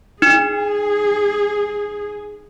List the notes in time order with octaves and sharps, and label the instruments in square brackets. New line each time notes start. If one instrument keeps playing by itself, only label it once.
[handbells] D#4 [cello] G#4